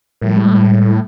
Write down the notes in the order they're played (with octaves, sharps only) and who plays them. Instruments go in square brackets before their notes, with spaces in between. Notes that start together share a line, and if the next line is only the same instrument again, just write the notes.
[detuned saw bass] A2 [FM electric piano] F3 G3 A#4
[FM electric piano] G3 G#3